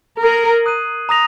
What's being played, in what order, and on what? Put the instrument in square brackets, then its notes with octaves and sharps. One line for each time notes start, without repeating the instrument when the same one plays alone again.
[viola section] A#4 [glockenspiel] D#6 G#6 C7 D#7 F#7
[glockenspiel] D#6 F#6 C7 D#7
A#5 D#6 A#6 F7